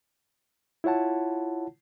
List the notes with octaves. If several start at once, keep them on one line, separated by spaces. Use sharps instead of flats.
E4 F4 C#5 F#5 A5